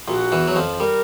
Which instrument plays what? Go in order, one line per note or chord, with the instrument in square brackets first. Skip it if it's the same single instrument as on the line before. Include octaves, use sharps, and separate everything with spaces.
[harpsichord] A#1 A#2 [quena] F#4
[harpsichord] E2 E3
F#3
F2 F3
[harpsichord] G3 [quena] A#4